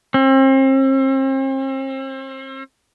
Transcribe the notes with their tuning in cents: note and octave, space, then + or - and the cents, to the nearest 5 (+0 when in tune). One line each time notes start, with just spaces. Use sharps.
C4 +40